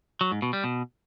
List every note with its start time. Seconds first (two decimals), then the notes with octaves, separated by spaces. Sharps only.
0.21 F#3
0.32 G#2
0.42 B2
0.53 G3
0.64 B2